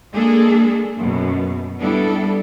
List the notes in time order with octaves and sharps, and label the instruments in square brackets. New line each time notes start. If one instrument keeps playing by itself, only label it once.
[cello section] G#3 A#3 D4 G#4 A4
F#2 B2
G3 B3 D4 E4 A4